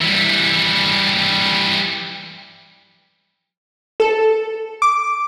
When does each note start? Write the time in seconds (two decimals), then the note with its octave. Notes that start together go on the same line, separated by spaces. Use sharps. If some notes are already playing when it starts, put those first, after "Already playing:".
0.01 E3 G3
4.00 A4
4.82 D6